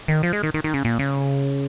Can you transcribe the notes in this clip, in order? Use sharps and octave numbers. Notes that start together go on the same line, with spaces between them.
D#3
F3
G#3
D#3
D#3
D#3
C#3
A#2
C#3